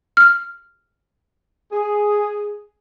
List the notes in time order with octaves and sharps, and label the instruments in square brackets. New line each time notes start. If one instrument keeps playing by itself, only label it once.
[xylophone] F6
[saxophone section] G#4